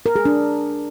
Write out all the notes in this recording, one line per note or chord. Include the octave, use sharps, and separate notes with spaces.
A#4
G#4
D4